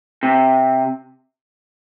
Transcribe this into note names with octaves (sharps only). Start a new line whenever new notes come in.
C3